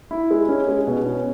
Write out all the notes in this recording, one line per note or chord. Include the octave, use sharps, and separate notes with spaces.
E4
G#3
C#4
G#3
B2
C#4